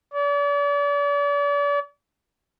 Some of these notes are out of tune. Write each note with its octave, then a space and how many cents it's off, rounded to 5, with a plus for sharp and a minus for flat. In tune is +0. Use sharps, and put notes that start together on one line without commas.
D5 -40